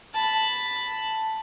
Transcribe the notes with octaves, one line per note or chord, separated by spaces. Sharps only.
A5 B5